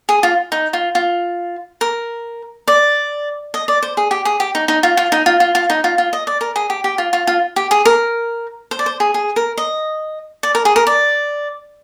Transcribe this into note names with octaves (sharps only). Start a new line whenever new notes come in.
G#4
F4
D#4
F4
F4
A#4
D5
D#5
D5
C5
G#4
G4
G#4
G4
D#4
D#4
F4
F4
D#4
F4
F4
F4
D#4
F4
F4
D#5
D5
A#4
G#4
G4
G4
F4
F4
F4
G4
G#4
A#4
C5
D5
C5
G#4
G#4
A#4
D#5
D5
A#4
G#4
A#4
D5